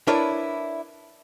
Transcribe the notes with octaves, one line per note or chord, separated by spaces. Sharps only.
D4 E4 A#4 B4 C#5 D5